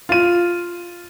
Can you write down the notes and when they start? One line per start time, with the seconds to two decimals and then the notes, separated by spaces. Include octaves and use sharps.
0.09 F4 D#7